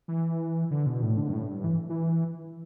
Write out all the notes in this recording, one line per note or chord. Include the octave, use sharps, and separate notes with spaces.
E3
D3
B2
A2
D3
G2
A2
G2
E3
E3